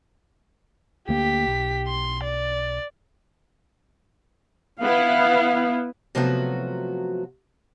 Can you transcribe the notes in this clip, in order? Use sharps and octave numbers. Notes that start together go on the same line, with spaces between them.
D2 A#3 G4 B6
B1
C6
D5
B3 E4 F5
C3 F3 F#3 A3 B3 F#4